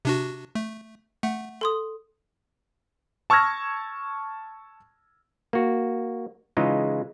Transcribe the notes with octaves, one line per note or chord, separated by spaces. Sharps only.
C3 D4 F#4
A3
A3 F#5
A4 C6 D#6
A5 C#6 E6 F6 G#6 A#6
A#3 F#4
C#3 E3 G#3 D#4 F4